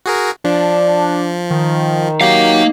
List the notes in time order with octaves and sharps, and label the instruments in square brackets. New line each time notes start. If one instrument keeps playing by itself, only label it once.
[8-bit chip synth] F#4 G#4 A#4
[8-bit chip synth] F3 [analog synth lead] D4
[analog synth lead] D#3
[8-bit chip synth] F#3 G4 [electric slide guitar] A#3 F5